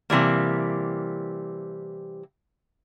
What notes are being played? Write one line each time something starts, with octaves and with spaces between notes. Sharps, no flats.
C3 E3 G3 A#3